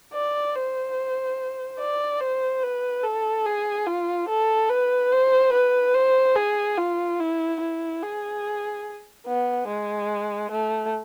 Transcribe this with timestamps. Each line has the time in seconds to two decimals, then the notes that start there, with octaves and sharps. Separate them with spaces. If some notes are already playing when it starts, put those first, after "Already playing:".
0.13 D5
0.55 C5
1.80 D5
2.20 C5
2.63 B4
3.03 A4
3.46 G#4
3.87 F4
4.29 A4
4.69 B4
5.12 C5
5.52 B4
5.94 C5
6.36 G#4
6.77 F4
7.20 E4
7.60 E4
8.03 G#4
9.27 B3
9.68 G#3
10.51 A3